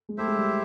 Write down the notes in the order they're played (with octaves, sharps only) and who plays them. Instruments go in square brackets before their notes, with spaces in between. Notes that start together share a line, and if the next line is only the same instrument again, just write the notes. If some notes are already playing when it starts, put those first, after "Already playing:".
[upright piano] G#3
[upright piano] A3 [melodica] E4 G4 C5 E5
[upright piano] G#3
G3